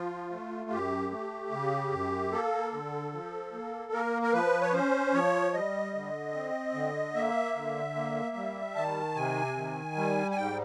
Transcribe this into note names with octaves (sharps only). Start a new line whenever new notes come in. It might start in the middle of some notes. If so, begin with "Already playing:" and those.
Already playing: F3 F4
A3
F#2 G4
A3
C#3
F#2
A#3 A4
D3
F3
A#3
A#3 A#4
A#4
F3 B4
C#5
C#4 C5
F3 C#5
G3 D#5
D3
C4
D3
A#3 E5
D3
A#3
G3
D#3 A5
C3 G#5
D#3
G3
G#5
G#2 G5